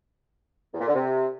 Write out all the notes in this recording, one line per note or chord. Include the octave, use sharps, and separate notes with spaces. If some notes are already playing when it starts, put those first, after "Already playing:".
E2
A#2
D3
C3